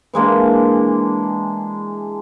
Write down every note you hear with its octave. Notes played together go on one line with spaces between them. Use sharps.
E3 G#3 A#3 D4